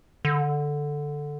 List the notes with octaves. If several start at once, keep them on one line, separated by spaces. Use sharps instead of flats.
D3